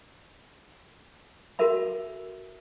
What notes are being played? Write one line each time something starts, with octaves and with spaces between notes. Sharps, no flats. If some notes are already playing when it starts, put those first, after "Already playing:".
F#4 A4 A#4 E5 B5